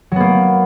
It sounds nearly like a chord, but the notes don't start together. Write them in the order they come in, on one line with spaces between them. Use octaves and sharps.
F#3 B3 A#3